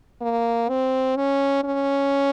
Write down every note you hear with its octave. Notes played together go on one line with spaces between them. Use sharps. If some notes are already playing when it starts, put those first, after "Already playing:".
A#3
C4
C#4
C#4